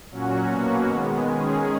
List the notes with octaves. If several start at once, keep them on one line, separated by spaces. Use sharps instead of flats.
A#2 F#3 C#4 F#4
B2 F#3 A#3 C#4 F#4
D#3 G#3 B3
D#3 G#3 C#4 G#4